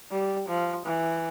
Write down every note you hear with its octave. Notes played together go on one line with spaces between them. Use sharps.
G3
F3
E3